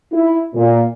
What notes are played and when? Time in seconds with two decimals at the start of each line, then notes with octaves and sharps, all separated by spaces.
0.13 E4
0.55 A#2